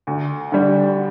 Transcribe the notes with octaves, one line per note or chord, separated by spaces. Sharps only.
D2
D3 G3